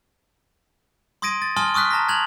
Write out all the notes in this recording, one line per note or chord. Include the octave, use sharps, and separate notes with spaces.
C6 D#6 G#6 A#6 D7 D#7
A6
G#5 A5 C6 D#6 F6 G7
C#6 D#6 F6 F#6 B6
A5 A#5 A#6 B6
A5 F#6 G#6 F7 F#7